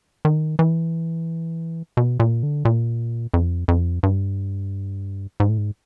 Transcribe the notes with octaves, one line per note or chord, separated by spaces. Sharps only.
D#3
E3
B2
A#2
D3
A#2
F2
F2
G2
G#2
A2
G#2